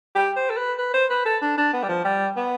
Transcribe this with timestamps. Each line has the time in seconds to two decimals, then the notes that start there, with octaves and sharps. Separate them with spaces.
0.15 G4
0.36 C5
0.50 A4
0.57 B4
0.78 B4
0.94 C5
1.10 B4
1.26 A4
1.42 D4
1.57 D4
1.73 B3
1.83 G3
1.89 F3
2.04 G3
2.37 B3